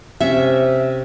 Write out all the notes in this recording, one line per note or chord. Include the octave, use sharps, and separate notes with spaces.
C3 C#4 E5 C#6